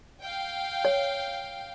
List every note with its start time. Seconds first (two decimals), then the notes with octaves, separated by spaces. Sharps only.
0.21 F5 G5
0.85 C#5